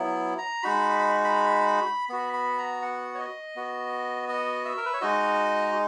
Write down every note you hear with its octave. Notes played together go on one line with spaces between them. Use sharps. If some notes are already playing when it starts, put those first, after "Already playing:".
Already playing: F#3 B3 E4
A#5
G#3 D#4 F#4 B5
B5
B5
B3 F#4 B5
B5
A#5
F#5
C#5
D#5
B3 F#4
D#5
E5
A#4
B4
C#5
G#3 D#4 F#4 D#5